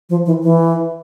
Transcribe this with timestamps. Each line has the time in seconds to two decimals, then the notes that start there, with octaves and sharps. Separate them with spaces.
0.09 F3
0.26 E3
0.43 E3